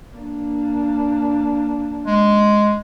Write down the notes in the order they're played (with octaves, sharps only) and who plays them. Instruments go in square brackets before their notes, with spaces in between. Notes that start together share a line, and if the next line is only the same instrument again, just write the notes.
[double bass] A#3 D4
[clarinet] G#3